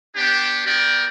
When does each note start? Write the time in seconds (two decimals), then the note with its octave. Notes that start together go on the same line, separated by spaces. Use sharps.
0.16 B3 D4 G4
0.66 G3 B3 F#4 A#4 D5 G5